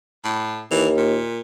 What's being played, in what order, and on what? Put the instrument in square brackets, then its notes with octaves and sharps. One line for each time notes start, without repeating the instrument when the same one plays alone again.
[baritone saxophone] A2
[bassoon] D#2 [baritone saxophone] E3
[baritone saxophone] A#2